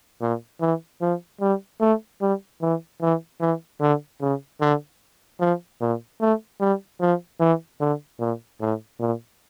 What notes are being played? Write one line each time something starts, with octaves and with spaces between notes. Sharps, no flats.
A#2
E3
F3
G3
A3
G3
E3
E3
E3
D3
C#3
D3
F3
A#2
A3
G3
F3
E3
D3
A#2
A2
A#2